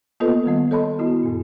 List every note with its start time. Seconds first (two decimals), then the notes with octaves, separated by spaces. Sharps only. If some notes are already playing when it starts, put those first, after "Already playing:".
0.20 A#3 B3 F4 A4 B4 D#5
0.46 D#3 G3 B3
0.71 A4 C#5 D#5 A5 B5 C6
0.99 B3 E4 F#4
1.23 F#2 A#2